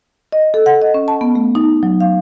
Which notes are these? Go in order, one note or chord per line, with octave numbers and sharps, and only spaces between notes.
D#5
A4
F#5
D#5
C#4
A5
B3
A3
D#4
F#3
F5